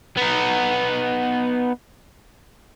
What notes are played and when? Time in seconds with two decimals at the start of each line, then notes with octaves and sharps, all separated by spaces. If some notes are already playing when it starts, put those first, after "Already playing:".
0.17 B3 D#4